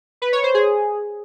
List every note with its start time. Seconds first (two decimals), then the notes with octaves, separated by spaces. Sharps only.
0.22 B4
0.33 C#5
0.43 C5
0.54 G#4